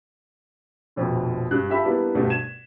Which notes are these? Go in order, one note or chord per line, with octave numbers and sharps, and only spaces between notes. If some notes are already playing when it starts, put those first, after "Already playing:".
F1 A#1 F2 B2 D3
G2 F#6
F4 G4 A4 E5 F5 B5
G3 A#3 B3 D4 E4
D2 G2 B2 G3 A3
G#6 D#7 E7